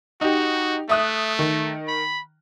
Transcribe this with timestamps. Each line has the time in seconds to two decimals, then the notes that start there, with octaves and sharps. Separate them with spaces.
0.21 D#4 F#4 G4
0.89 A3 E5 D#6 F#6
1.39 D#3
1.88 B5